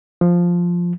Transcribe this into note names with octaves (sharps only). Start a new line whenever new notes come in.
F3